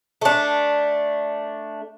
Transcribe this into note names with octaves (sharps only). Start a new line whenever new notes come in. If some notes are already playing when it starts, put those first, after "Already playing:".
A3 D4